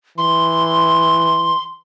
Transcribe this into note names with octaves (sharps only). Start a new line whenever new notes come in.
E3 C6